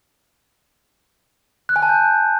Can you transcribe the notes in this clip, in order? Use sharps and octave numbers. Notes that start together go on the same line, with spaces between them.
F#6
G#5
A5
G6